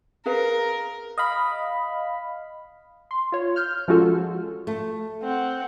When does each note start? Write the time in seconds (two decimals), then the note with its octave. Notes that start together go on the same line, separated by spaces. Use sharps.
0.26 G#4 A#4 B4 F5
1.18 D#5 F5 B5
3.11 C6
3.32 F4 C#5
3.56 F6 G6
3.88 F3 G#3 C#4 F4 F#4 A4
4.67 A3
5.23 C4 F#5